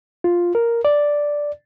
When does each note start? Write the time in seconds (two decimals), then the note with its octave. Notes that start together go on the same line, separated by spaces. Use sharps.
0.24 F4
0.55 A#4
0.85 D5